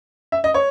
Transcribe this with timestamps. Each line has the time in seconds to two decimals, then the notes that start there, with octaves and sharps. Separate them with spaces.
0.32 E5
0.44 D#5
0.54 C#5